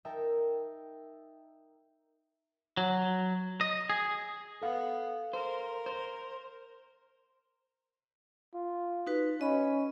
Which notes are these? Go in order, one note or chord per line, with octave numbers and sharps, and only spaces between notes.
D#4 A#4 E5 G5 A5
F#3
D#5
G#4
B3 A4 F5
A#4 C5
C5
F4
D#4 F#4 B4
C#4 D#5 B5